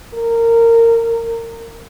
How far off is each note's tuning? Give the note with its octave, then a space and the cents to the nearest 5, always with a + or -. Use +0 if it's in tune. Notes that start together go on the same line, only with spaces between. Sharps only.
A#4 -20